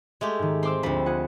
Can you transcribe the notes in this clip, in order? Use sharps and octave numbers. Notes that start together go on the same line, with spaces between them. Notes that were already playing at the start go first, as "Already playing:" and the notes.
G#3 A3 G4
G#2 D#3
C4 C6 D6 E6
D2 F3 C4 B5
F4 G#4 F#5